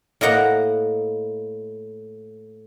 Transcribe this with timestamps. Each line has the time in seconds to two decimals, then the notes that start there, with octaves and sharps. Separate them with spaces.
0.21 A2 A#3 D#5 F#5 A#5